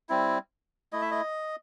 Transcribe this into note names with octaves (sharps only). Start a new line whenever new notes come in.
G3 C4 E4
A3 E4 D#5
E5
D#5